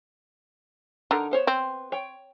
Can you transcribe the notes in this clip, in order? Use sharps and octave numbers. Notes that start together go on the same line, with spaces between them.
D3 D#4 A#4 A#5
B3 C5 C#5
C4
C#5 G5